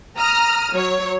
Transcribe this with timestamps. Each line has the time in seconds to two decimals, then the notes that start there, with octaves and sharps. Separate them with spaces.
0.17 A#5 D#6 F6
0.73 F#3 C#5